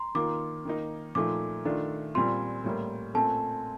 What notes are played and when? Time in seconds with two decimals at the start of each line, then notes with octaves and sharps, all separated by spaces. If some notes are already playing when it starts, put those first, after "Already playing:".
Already playing: A#5 C6
0.15 D#3 A#3 F4 D6
0.65 D#3 A#3 D#4
1.15 A#2 F3 A3 D#4 D6
1.65 D#3 A3 D4 F4
2.14 A#2 G3 C4 F4 C6
2.64 A2 G3 A#3
3.14 A#2 A3 C4 A5